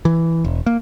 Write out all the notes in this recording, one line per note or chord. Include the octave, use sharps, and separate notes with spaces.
E3
E1
A#3